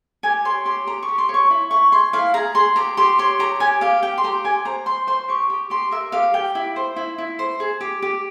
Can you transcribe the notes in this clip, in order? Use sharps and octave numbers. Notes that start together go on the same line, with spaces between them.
G4 G#5
C#5 C6
G4 C6
G4 A#5
C#6
G4
C6
C#5
C#6
E4
E4 C#6
G#4 C6
E4 F5
G#4 A#5
G#4 C6
G4 A#5
G4 C6
C#5 C6
G4 A#5
G4 G#5
G4 F5
G4 G5
C6
G4 A#5
G4 G#5
C5 A#5
C5 C6
C5 C6
G4 C#6
G4
G4 C6
A#4 E5
G4 F5
G4 G5
E4
C5
E4
E4
C5
G#4
G4
G4